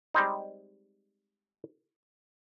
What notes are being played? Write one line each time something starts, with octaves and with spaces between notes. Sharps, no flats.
G3 G#3 C4 D#4